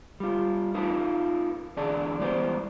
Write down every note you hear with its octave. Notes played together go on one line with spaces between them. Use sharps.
G3 F4
D#4 F4 A4 B4
E2 D3 G#4 D5 A5
E3 G3 G#3 B3 E4 C5